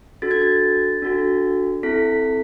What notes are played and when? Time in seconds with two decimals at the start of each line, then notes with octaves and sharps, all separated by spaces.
0.22 D4 F#4 A4 A6
0.31 G#6
0.42 A6
1.02 D4 F#4 A4
1.83 C4 E4 A4 B6